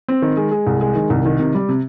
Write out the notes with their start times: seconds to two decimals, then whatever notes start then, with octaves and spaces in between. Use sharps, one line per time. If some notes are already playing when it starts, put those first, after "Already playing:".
0.08 C4
0.22 D#3
0.37 G#3
0.51 G#3
0.67 C2
0.81 G#3
0.95 D#3
1.10 C2
1.25 D#3
1.40 C3
1.55 G3
1.69 C3